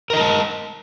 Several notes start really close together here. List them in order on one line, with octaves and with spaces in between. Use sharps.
A#4 D#5 A#5 A5